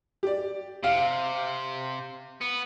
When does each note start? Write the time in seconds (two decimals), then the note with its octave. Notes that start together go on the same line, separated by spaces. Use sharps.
0.23 G4 D5
0.84 C3 F5
2.41 B3